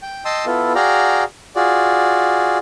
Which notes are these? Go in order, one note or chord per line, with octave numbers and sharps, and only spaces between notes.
G5
D#5 G5 A5 C6 D#6 E6
B3 E4 F4 A4
F#4 G#4 D5 F5 G5 A#5
F4 F#4 G#4 D5